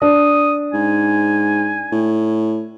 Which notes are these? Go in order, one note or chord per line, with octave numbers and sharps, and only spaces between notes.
D4 D#6
G#2 G#5
A2